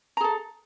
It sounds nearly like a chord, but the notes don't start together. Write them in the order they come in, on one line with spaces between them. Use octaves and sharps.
A#5 G#4 A4